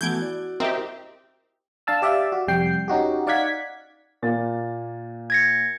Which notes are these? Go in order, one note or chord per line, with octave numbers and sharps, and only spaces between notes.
E3 A3 B3 E4 F#4 G6 G#6 D7
D5
C4 G4 A#4 D#5 E5
D4 F5 A5 E6
G4 D5 E5 F5
F#4
F2 C3 G3 G5 C7
C#4 D#4 F#4 G4
D#4 D5 F5 F#5 G#6 B6
A#2 A#3 A6
G#6 A#6 C#7